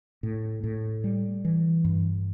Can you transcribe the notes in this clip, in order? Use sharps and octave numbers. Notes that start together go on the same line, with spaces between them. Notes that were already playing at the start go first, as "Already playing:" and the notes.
A2
A2
G3
E3
G2